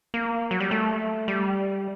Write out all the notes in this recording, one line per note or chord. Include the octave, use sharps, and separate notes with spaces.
A#3
F#3
G3
A3
G3